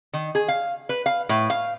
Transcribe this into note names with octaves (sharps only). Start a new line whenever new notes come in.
D#3
G#4
F5
B4
F5
A2
F5